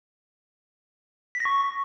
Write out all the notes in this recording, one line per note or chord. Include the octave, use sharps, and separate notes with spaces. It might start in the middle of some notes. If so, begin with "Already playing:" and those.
B6
A#6
C#6